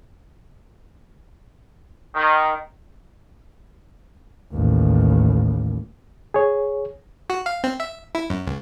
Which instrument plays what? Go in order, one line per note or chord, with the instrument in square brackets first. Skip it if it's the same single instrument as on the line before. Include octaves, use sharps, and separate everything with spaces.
[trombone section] D#3
[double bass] A1 D#2
[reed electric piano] G#4 C#5
[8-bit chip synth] F#4
F5
C4
E5
E4
F#2
C#2